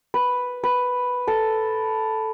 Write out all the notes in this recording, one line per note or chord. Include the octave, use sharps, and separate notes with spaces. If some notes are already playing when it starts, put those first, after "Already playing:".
B4
B4
A4